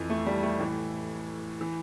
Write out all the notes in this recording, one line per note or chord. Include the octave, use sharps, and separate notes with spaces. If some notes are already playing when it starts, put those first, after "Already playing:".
Already playing: F2 E3
A3
G3
A3
A2 E3
E3